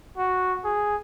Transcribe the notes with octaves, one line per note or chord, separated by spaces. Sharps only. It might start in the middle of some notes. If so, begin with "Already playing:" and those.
F#4
G#4